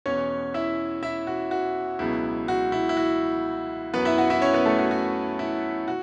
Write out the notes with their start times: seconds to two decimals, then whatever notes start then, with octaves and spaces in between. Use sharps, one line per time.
0.06 E2 B2 B3 C#4 C#5
0.54 E4 E5
1.03 E4 E5
1.27 F#4
1.51 F#4
1.99 C#2 B2 F#3 B3 E4
2.48 F#4
2.72 E4
2.89 E4
2.97 F#4
3.94 F#2 F#3 B3 B4
4.05 E4 E5
4.18 F#4 F#5
4.30 E4 E5
4.42 C#4 C#5
4.54 B3 B4
4.66 A3 A4
4.79 F#4
4.91 F#4
5.39 E4
5.88 F#4